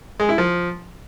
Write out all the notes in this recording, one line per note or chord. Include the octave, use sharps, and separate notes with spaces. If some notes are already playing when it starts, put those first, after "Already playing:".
G#3
E4
F3